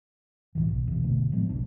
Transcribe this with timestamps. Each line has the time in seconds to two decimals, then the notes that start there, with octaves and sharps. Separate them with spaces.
0.55 B1 F2 G#2 E3
0.68 B1
0.87 E2 B2
1.03 G1 B2 D3 A3
1.31 A2 F3 G#3 B3
1.49 F1 B1 F2 D4